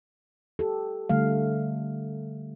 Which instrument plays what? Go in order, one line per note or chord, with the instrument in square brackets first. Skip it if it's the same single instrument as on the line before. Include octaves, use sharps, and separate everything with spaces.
[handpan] G4 A4
D3 G3 A3 F5